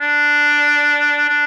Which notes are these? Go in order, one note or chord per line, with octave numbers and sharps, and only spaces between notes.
D4
D4